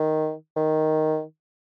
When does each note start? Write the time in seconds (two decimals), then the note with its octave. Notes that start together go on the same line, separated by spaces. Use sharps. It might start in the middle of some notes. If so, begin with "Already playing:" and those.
Already playing: D#3
0.56 D#3